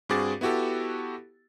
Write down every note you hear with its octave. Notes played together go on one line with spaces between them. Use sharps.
G2 C4 F#4 G#4 D6 A6
B3 E4 F#4 G4 A4